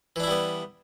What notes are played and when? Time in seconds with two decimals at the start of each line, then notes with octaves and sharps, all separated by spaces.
0.16 E3
0.20 D4
0.23 E4
0.27 G3
0.31 B3